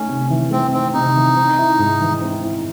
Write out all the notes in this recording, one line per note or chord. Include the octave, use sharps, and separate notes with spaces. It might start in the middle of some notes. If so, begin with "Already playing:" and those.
Already playing: A3 C#4 D#4
C3
E3
A3 C4
C4 D#4
C3 D#4
E3
C4
E4
G#2
E3
C4
E4